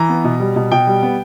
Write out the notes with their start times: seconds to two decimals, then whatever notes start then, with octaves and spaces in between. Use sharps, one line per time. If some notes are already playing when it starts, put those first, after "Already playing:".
Already playing: E3 A#5
0.09 B3
0.24 B2
0.40 G3
0.56 B2
0.72 B2 G5
0.87 G3
1.03 B3